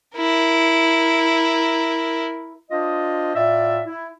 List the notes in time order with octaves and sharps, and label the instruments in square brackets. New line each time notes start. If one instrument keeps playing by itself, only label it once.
[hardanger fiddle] E4 A#4
[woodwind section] D4 F4 C5 D#5
A2 F4 D5 E5
E4